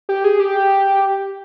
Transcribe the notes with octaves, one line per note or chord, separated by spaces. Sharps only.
G4
G#4
G4